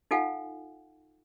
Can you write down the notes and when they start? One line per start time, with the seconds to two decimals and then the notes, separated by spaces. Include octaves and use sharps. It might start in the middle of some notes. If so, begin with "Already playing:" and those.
0.11 D#4 F4 A4 F5 F#5 G#5